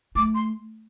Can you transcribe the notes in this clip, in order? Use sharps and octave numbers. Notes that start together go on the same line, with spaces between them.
A3 D6
C6